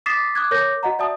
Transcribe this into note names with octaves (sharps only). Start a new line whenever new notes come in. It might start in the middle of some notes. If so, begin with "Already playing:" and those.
D6 D#6 A6 B6 C7 E7
D6 D#6 F#6 G#6
A#4 C#5 D6 G6 A#6
F#4 D#5 F#5 A#5
D5 E5 A5 D#6